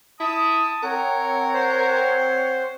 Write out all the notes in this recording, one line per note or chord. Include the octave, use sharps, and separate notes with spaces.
E4 A5 D#6
C4 A#4 C#5 F#5
C5